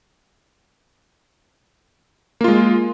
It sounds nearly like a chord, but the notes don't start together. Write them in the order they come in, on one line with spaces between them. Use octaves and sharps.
A#3 F4 G#3